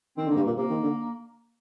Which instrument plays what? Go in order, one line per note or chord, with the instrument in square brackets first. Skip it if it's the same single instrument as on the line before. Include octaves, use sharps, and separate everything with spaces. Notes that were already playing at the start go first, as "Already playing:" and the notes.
[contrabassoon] D#3 [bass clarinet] C4
[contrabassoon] D3
[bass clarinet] A#3
[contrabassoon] G2
[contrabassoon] A#2 [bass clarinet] A#3
[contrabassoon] C3 [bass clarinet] A#3
[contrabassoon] D#3
D3